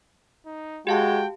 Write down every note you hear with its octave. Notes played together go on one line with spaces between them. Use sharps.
D#4
G#3 F#4 G4 F5 G5 A5